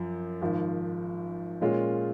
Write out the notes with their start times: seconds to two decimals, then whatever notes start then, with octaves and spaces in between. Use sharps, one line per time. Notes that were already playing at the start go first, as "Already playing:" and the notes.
Already playing: F#2 F3
0.41 G#1 G#2 F3
1.61 A#2 G#3 C#4 F4